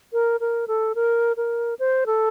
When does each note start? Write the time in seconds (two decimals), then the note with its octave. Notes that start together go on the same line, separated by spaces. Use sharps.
0.13 A#4
0.40 A#4
0.68 A4
0.95 A#4
1.37 A#4
1.79 C5
2.06 A4